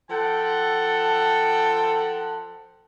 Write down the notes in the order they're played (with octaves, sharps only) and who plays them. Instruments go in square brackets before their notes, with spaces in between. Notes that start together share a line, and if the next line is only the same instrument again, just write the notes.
[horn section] F3 A4 F#5 G5